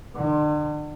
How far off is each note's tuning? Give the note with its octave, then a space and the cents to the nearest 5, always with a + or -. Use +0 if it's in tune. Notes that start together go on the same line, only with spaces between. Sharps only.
D3 +40